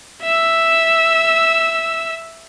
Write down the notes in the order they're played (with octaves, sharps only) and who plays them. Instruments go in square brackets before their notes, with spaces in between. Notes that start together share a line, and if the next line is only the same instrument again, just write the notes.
[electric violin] E5 E6